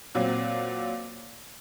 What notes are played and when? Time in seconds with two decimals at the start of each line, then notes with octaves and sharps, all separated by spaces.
0.15 A#2 F#3 C4